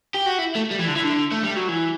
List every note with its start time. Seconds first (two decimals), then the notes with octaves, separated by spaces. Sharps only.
0.14 G4
0.26 F#4
0.38 E4
0.55 A3
0.71 G3
0.79 E3
0.87 D3
0.96 E3
1.03 D3
1.32 A3
1.44 G3
1.56 F#3
1.69 E3